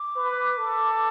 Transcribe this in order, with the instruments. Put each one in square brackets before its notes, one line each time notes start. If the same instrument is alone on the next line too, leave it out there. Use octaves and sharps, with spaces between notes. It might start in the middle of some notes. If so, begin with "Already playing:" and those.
Already playing: [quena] D6
[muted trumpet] B4
A4